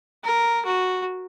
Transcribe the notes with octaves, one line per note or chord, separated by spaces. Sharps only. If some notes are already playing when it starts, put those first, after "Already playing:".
A#4
F#4